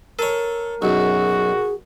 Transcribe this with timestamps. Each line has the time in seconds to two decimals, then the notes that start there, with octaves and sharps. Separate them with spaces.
0.19 A4 A#4 C#5
0.82 B1 F#2 F#4 G#4